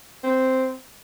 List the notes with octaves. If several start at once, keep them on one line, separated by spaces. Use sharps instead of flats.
C4